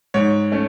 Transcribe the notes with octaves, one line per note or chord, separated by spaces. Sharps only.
G#2 C#5
A3 C#4